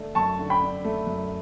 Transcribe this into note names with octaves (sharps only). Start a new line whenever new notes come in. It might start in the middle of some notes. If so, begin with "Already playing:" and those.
Already playing: D3 A3 D4
F#2 A5 C#6
D3
G5 B5
D4
A3
F#2